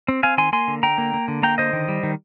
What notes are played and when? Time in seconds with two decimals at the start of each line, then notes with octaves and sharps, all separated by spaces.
0.08 C4
0.23 C4 F5 G#5
0.38 D#3 G#5 C6
0.53 A#3 G#5 C6
0.68 D3
0.83 D3 G5 A#5
0.98 A#3
1.14 A#3
1.28 D3
1.43 A#3 G5 A#5
1.58 D3 C5 D#5
1.73 D#3
1.88 G3
2.03 D#3